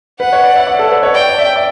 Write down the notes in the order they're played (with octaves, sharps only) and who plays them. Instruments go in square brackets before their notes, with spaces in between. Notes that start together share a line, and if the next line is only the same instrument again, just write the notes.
[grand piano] B4 [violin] F#5
[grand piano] C#5
D5
E5
D5
A4
B4
C#5
[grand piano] D5 [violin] G5
[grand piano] D5
E5
D5